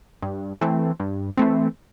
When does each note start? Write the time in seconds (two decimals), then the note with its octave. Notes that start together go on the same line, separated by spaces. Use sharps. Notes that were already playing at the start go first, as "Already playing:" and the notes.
0.22 G2
0.61 E3 A3 C4
1.00 G2
1.37 E3 A3 C4